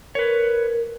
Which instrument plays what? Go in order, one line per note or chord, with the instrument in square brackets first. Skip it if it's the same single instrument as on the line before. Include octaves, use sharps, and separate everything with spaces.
[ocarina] A#4 [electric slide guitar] B4 C#5